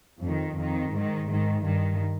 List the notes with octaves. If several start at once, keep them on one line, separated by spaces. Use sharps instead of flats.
F2
D#3
F2 D#3
G#2
D#3
G#2 D#3
G2 D#3